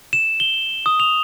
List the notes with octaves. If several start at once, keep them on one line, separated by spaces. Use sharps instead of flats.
E7
G7
D#6
F7